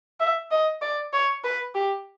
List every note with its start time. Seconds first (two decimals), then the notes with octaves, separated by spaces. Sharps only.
0.20 E5
0.51 D#5
0.82 D5
1.13 C#5
1.44 B4
1.75 G4